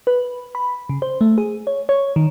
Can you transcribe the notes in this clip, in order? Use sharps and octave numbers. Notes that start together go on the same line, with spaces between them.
B4
B5
C#3
C5
A3
G#4
C#5
C#5
D#3